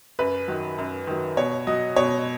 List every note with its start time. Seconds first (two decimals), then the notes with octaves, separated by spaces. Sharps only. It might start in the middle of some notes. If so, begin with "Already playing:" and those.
0.19 F#2 B4
0.48 D#3 F#3
0.78 F#2
1.07 D#3 F#3
1.37 B2 C#5
1.67 F#3 D#5
1.96 B2 C#5